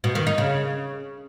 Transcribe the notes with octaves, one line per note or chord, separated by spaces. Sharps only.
B2
D#3
D#4
C#3